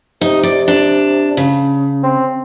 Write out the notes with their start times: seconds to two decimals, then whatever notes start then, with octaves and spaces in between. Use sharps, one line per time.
0.21 C3 D#4
0.43 D5
0.68 D4
1.37 C#3
2.03 C4